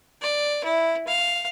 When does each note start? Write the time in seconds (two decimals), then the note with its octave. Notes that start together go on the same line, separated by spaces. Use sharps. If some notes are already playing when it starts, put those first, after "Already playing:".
0.22 D5
0.64 E4
1.07 F5